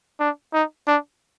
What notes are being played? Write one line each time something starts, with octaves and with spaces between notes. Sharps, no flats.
D4
D#4
D4